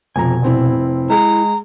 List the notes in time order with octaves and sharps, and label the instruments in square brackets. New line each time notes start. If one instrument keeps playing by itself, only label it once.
[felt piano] F1 F2 A#5 [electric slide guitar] B2 G#5
[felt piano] F1 C4 E4
[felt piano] G#3 G#4 [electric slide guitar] E4 [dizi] A#5